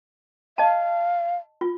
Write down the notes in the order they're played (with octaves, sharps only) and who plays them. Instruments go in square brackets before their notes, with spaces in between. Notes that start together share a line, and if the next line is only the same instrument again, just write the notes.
[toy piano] D#5 A5 [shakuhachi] F5
[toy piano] F4